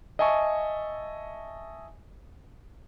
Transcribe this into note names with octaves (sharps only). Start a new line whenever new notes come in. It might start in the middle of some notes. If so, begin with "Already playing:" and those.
D#5 E5 G#5 A5 C#6